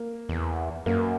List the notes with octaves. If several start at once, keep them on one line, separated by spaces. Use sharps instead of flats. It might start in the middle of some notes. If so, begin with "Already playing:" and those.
Already playing: A#3
E2
F#2 A#3